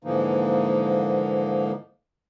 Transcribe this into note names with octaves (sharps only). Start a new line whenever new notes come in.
G#2 D3 E3 F3 A#3 D#4